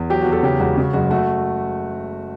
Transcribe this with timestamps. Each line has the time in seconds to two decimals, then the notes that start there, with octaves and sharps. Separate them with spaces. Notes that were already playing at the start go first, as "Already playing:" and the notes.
Already playing: E2
0.10 F#3 G4
0.21 E2 F#4
0.32 A4
0.43 C#3 G4
0.60 E1 F#4
0.77 C#3 F#4
0.93 F#1 F#4
1.10 A3 F#4